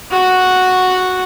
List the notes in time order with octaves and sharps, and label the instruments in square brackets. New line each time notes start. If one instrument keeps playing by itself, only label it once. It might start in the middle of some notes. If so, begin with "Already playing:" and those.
[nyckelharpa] F#4 F#5